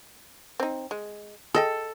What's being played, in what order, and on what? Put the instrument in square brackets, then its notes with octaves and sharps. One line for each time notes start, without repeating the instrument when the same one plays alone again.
[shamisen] C4 D#4
G#3
[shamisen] G#4 D#5 G5 [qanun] A4